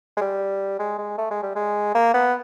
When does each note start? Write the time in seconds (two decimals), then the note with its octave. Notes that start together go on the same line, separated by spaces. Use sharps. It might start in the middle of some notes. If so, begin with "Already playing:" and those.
0.17 G#3
0.21 G3
0.79 G#3
0.98 G#3
1.18 A3
1.31 G#3
1.43 G3
1.55 G#3
1.95 A#3
2.14 B3